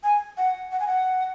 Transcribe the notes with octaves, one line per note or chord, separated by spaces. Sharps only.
G#5
F#5
F#5
G#5
F#5